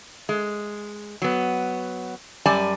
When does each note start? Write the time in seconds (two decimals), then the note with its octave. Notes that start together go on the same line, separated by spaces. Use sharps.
0.29 G#3
1.22 F#3 B3
2.46 F#2 G3 D5 G#5 A5